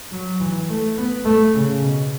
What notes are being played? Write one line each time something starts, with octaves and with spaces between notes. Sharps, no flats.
F#3
E3
A3
B3
A3
C#3
B2